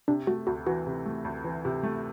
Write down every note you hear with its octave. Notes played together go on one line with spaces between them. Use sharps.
C3 D4
A3 F#4
D2 F#4
E3 F#4
C3
A3
D2
E3
C3
A3